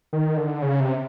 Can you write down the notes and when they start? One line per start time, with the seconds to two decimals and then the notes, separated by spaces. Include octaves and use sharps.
0.13 D#3
0.37 D3
0.62 C#3
0.80 C3